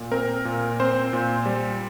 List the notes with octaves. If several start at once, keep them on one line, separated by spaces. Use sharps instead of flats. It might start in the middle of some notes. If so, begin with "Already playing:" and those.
Already playing: A#2
C4 A#4
A#2
C4 C5
A#2
G3